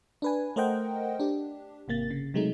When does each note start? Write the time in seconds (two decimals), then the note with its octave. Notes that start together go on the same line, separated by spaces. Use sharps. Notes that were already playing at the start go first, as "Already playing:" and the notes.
0.22 D4 B4 G#5
0.56 A3 A#4 C5 D#5 F#5 G5
1.20 D4 G4
1.88 G#1 C3 A#3 A6
2.10 C#3
2.34 C3 F#3 G#3 A3 D#4